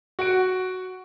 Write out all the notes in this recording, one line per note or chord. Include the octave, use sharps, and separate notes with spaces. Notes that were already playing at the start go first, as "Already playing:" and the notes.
F#4 F#5 D7